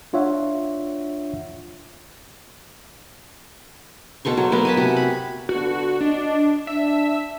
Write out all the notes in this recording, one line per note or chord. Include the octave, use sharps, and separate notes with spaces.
D4 F4 C#5 E5 F#5
B2 A4 C5 C#6
F#3
F#3 B3 F#4 A#4
G#5 A5 B5
C3 F#4
B5
D3 B3 F4 F#4
D4 D#5
D4 E5